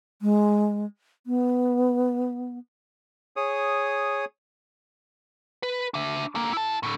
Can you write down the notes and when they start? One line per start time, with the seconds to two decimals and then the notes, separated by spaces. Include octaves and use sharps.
0.22 G#3
1.27 B3
3.36 G#4 C#5 D#6
5.63 B4
5.94 D4 E5
6.35 D3 A#3
6.53 E4 A5
6.83 A2 D3